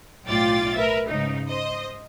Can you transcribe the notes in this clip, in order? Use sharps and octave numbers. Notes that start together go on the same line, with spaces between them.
B1 A2 F4 D5 G5 A6
A#4 B4 E5
G#2 C#3 D#4
C5 D#5